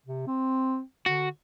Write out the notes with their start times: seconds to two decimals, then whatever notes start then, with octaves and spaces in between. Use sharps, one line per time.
0.06 C3
0.27 C4
1.06 D3 F#4